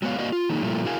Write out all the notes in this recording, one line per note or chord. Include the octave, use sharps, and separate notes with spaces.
F#3 G#3 B3 C#5 F5
A#3 F#4 C5 D5 D#5 F5
F4
D#3 F3 F#3 A#3 D#4 G#4
A#2 F3 G3 A3 A#3 E4
E4 F#4 G#4 A#4 F5 G#5